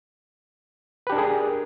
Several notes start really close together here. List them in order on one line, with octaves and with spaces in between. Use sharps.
B4 G4 D4 A#4 G#4